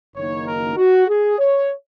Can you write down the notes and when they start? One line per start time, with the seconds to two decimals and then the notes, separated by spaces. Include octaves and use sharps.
0.15 F#1 F#2 D#3 A#3 D#4 C#5
0.46 A#4
0.77 F#4
1.08 G#4
1.38 C#5